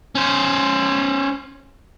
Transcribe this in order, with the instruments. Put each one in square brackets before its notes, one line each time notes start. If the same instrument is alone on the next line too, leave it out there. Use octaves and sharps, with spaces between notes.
[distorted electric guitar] C#4 C5